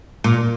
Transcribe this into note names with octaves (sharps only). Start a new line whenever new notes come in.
A#2